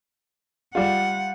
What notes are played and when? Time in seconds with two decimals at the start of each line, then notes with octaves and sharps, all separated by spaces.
0.75 G3 F4 F#5